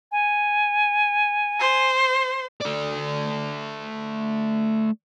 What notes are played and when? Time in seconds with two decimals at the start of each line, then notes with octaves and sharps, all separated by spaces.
0.12 G#5
1.60 C5
2.62 A3 D5